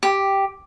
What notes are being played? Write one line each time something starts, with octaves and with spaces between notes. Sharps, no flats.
G4